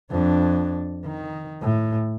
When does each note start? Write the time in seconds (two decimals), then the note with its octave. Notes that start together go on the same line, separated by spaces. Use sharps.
0.11 F2 D4
1.06 D#3
1.61 A2